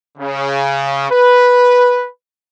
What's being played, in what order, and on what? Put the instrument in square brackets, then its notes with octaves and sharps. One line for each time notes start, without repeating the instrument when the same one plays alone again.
[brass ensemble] C#3
B4